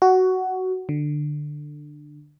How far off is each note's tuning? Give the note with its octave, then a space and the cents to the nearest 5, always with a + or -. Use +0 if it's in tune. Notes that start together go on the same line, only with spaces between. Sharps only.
F#4 +10
D3 +15